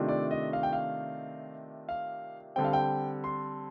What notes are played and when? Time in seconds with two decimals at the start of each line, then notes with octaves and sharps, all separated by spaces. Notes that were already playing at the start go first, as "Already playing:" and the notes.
Already playing: C3 D#3 A3 D4 F4
0.08 D5
0.31 D#5
0.53 F5
0.63 G5
0.73 F5
1.89 F5
2.56 D3 G3 C4 G5
2.64 F5
2.73 G5
3.24 C6